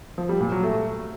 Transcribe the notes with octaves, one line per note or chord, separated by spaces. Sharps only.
F3
G3
A#2
F#3
A3